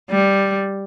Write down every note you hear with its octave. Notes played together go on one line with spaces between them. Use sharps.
G3